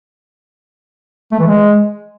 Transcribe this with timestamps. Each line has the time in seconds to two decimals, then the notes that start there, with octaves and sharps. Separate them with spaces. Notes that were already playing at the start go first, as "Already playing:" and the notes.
1.32 A3
1.39 E3
1.46 G#3